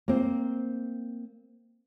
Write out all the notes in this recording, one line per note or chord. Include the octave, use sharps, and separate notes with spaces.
A#3 C4